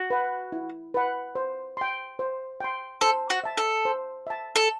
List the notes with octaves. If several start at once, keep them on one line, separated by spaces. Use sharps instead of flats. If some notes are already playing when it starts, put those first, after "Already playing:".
Already playing: F#4
B4 F#5
E4
B4 F#5
C5
G5 C6
C5
G5 C6
A4 C5
F#4
E5 A5
A4
C5
E5 A5
A4